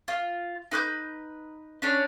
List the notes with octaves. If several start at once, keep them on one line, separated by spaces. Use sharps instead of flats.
F4
D#4 B4 D6 G6
C#4 D4 C#5